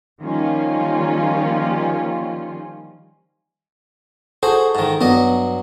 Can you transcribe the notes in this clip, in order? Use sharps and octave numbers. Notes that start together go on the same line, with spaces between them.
D#3 F3 G3 A#3 C#4 F4
F#4 G#4 A4 C5
G#2 D#3
G2 F#3 B3 D#5